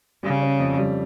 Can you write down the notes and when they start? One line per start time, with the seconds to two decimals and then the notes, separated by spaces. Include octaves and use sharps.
0.23 C#3 G3
0.42 C#4
0.60 F2
0.78 G3